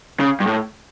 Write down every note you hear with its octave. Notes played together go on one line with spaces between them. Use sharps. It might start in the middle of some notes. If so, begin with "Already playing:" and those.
C#3
G2
A2